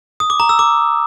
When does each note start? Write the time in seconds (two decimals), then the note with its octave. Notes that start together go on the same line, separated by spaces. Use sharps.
0.20 D#6
0.30 D6
0.40 A#5
0.49 E6
0.59 D6